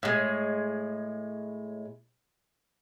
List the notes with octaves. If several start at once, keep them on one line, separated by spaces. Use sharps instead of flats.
A2 G#3